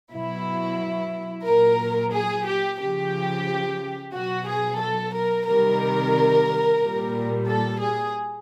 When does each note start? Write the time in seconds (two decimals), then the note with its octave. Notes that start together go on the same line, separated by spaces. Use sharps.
0.13 B2 F#3 E4
1.46 A#2 F#3 A#4
2.13 G#4
2.46 G4
2.80 C#3 F3 G4
4.13 B2 F#3 F#4
4.47 G#4
4.80 A4
5.13 A#4
5.47 C3 D#3 G3 A#4
6.81 A#2 G3
7.47 A4
7.81 G#4